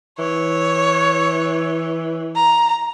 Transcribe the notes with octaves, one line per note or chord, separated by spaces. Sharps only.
E3 C#5
A#5